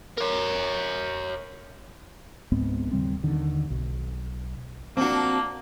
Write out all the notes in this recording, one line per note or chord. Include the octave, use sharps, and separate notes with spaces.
A#4 C#5
C#2 G#2 B3 C4
D#2 C#3 G3 C4
D#2 D3 D#3
B1
F3 A#3 C4 D4 F#4